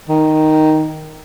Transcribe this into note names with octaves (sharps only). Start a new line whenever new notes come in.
D#3